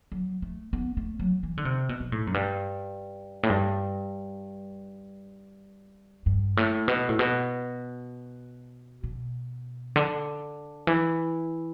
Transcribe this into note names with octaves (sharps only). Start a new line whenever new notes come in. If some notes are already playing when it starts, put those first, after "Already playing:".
F#3
A3
B3
A3
F#3
E3
D3
C3
B2
B2
A2
F#2
G2
A2
G2
G2
A2
B2
A2
B2
B2
D3
E3